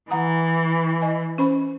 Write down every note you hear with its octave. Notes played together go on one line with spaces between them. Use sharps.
E3 F#5 A#5 D#6
D#5 G#5
C#4 C5 B5